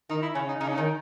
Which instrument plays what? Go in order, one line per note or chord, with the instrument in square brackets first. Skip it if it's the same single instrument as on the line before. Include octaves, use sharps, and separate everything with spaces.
[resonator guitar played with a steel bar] D#3 [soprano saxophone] D#4
[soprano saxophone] E4
[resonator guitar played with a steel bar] C#3 [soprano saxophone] C#4
[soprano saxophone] D#4
[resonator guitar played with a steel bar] C#3 [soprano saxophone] D#4
[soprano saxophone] C#4
[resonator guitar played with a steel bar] D#3 [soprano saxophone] D#4